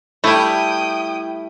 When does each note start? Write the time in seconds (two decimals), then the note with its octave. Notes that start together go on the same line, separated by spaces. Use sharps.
0.24 G3 A3 E4 G5 D#6